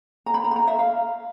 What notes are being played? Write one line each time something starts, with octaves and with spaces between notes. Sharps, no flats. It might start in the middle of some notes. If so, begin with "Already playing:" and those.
A#5
B5
A#5
B5
A#5
E5
F5